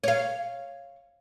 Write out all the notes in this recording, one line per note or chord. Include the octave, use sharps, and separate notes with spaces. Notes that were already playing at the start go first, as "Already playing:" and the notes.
C#5 F5